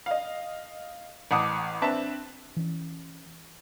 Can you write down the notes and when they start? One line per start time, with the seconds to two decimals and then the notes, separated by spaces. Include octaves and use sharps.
0.06 D#5 F5
1.31 A1 F#5 A5 D6 D#6
1.82 C4 D4 B4 E5 A5
2.56 E3 C#4